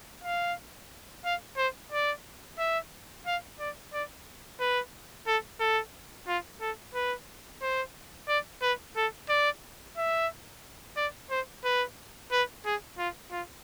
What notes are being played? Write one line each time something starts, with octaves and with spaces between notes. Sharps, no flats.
F5
F5
C5
D5
E5
F5
D5
D5
B4
A4
A4
F4
A4
B4
C5
D5
B4
A4
D5
E5
D5
C5
B4
B4
G#4
F4
F4